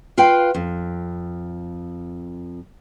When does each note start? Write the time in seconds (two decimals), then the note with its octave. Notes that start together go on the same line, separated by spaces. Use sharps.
0.18 F4 B4 F5 G5
0.54 F2